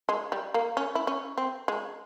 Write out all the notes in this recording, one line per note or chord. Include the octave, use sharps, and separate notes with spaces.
G#3
G3
A#3
C#4
E4
C#4
C4
G#3